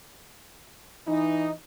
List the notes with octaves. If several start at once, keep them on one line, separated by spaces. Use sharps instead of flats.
E3 D#4